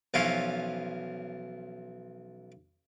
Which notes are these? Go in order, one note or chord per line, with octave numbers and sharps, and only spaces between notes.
B1 E3 F3 C#4 F5